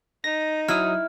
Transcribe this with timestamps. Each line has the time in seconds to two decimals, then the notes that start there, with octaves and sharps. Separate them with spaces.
0.24 D#4 A#6
0.68 F#3 E4 D#6 F6